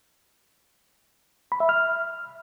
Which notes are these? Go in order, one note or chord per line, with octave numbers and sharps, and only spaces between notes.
B5
E5
F6